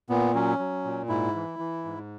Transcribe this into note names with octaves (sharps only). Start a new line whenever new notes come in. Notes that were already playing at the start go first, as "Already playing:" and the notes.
A#2 B3
F#3 C#4
F#3
A#2
G#2 E4
E3
E3
G#2